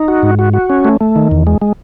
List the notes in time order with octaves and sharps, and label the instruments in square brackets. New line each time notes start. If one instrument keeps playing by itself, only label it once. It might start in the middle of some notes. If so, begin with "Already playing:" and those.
Already playing: [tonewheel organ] D#4
F#4
G#2
F#4
F#4
C#4
A3
A3
D#3
E2
G#3
G#3